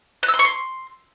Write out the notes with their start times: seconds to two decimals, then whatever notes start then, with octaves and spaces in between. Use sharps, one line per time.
0.23 F#6
0.28 E6
0.34 C6
0.39 C#6
0.45 C6